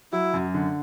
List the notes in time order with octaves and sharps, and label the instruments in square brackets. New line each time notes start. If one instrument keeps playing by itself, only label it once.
[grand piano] F#3 [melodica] E4
[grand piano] F#2
D3